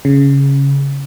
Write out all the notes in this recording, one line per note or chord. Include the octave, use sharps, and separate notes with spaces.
C#3